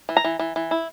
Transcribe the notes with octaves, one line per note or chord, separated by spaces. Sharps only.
E3
A#5
E3
E3
E3
E4